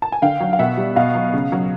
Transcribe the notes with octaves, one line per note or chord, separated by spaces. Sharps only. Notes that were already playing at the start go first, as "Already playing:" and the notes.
A5
G#5
D3 F5 G5
F#3
F5
B2 E5 F#5
G3
B2 D#5 F5
F#3
C#3
F#3